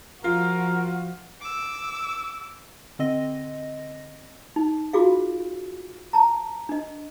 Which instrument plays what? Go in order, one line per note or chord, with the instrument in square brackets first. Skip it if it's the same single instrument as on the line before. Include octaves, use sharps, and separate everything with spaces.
[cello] F3 [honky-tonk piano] F4 [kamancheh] F#4 [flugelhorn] A#4
[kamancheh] D6 E6
[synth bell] D3 C4 D#5 A#6
[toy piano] D#4
F4 F#4 G#4 F5
A5 A#5
D4 D#5